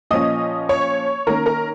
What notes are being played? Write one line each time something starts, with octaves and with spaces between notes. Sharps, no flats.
A#2 F3 C#4 D#5 D#6
C#5 C#6
D#3 A#3 C#4 A#4 A#5
A#4 A#5